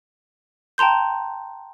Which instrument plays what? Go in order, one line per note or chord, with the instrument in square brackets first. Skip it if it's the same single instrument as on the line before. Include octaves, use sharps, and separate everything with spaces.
[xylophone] G5 A5 A#5 C6 G6